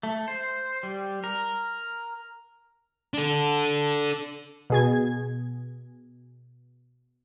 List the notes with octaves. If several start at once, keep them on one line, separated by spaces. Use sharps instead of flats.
A3
C5
G3
A#4
D4 A4
B2 G#4 G#6